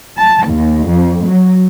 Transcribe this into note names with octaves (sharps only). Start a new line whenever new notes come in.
A5
D#2
F2
F#3